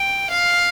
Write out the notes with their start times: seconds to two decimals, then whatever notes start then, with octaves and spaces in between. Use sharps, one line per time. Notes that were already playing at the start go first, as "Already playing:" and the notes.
Already playing: G5
0.30 F5